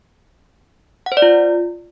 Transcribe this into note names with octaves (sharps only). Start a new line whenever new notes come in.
F#5
C5
D5
F4